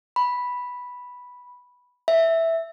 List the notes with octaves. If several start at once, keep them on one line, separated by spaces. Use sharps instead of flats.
B5
E5